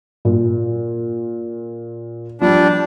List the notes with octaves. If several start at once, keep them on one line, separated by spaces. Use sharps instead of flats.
A#2
F3 G3 D4